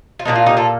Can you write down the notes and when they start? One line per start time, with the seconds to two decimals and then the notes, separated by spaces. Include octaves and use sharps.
0.19 F4
0.25 A#2 F3 A#3 D4 D#4
0.35 F4
0.46 D#4 G4
0.57 F4 A4